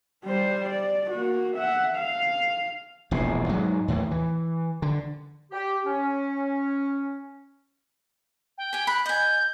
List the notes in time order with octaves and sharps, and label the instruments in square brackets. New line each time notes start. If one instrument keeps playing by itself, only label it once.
[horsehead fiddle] G3 C5
D5
A#3 F#4
E5 F#5
F5
[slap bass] E1 A#1 E2 A2
G#2 F#3 G#3
D#2 A2 E3
E3
D3
[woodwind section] G4
C#4
[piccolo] G5
[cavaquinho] G4 G#5
[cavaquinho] B5 [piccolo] F#6
[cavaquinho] D#5 G#5 [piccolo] G6